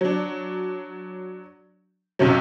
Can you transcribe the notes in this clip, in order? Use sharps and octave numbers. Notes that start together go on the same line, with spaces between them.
F#3 D4
B1 F#2 C3 F#3